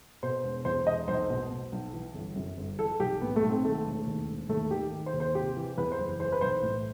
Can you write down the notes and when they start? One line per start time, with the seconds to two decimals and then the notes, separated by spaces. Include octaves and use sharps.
0.23 B2 C5
0.44 E1
0.65 E2 C5
0.87 E1 D#5
1.08 B1 C5
1.30 B2
1.50 B2
1.72 B1
1.93 E3
2.14 G1
2.36 F#2
2.58 G1
2.79 E3 A4
3.00 B1 G4
3.21 A2 B3
3.36 A3
3.43 B1
3.49 C4
3.64 D#3 A3
3.85 E1
4.07 D#2
4.28 E1
4.49 D#2 A3
4.71 D#3 G4
4.92 D#3
5.06 C5
5.13 D#2
5.20 C5
5.35 C3 G4
5.56 E3
5.78 E2 B4
5.92 C5
5.99 F#1
6.20 E3 C5
6.32 B4
6.41 B1 C5
6.63 A2